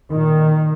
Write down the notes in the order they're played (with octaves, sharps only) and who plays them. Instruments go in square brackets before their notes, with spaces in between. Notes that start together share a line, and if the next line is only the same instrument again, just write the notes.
[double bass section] A#2 D#3